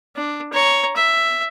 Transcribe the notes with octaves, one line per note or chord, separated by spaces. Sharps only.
D4
C#5 A#5
E5